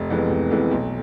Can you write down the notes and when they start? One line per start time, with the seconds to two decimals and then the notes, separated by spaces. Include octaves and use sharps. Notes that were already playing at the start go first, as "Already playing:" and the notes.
Already playing: F1
0.10 F2 E3 G#3 B3
0.30 F1
0.50 F2 E3 G#3 B3
0.71 B1